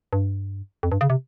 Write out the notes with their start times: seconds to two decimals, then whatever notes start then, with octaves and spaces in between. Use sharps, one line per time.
0.13 G2
0.83 F2
0.92 G2
1.01 C#3
1.10 C3